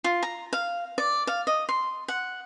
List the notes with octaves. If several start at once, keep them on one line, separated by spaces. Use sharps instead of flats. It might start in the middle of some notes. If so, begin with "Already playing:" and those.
F4
A#5
F5
D5
F5
D#5
C6
F#5